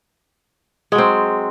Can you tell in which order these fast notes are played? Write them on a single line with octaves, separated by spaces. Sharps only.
G#3 F#3 C4